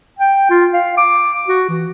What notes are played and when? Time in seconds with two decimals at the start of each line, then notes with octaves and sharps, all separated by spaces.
0.19 G5
0.50 F4
0.73 F5
0.97 D6
1.48 F#4
1.69 E3